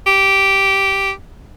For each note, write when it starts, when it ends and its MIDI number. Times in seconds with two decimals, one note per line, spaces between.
0.07 1.11 67